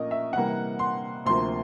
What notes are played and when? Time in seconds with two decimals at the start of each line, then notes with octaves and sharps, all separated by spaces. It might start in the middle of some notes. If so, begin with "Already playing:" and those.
Already playing: A#2 F3 A3 C#4 A#4 D#5
0.11 E5
0.33 C3 E3 G3 A#3 F#5
0.79 C6
1.25 D2 C3 F3 A#3 C6